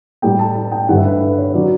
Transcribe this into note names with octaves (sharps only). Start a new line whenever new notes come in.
A2 G3 G5
A5
A5
G5
G2 D3 G3 F#5
E5
B4
B4
C#5
D3 F#3 D5